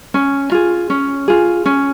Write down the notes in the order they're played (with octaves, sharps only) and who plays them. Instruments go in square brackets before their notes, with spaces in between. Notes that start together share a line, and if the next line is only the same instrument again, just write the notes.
[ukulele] C#4
F4 G#4
C#4
F4 G#4
C#4